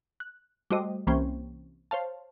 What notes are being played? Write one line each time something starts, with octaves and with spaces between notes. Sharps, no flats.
F#6
G3 A3 F#4 C5 D#5
C2 E3 A#3 C#4 C5 G5
C5 C#5 F5 A5